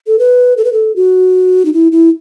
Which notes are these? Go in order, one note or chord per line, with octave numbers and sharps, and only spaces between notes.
A4
B4
A4
B4
A4
F#4
D#4
E4
E4